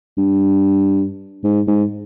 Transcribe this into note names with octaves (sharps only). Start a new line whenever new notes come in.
G2
G#2
G#2